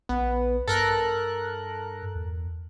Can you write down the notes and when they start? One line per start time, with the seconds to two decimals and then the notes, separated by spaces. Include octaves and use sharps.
0.09 A#1 B3
0.67 G2 A4 A#4 F#6
2.15 E2